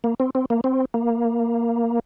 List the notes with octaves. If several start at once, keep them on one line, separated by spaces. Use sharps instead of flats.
A#3
C4
C4
A#3
C4
A#3